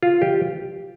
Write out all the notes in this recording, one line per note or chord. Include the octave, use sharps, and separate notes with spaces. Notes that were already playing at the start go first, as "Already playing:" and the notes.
F4
G4